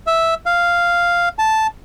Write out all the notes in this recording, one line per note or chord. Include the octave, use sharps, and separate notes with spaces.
E5
F5
A5